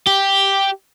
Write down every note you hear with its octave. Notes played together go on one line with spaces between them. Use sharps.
G4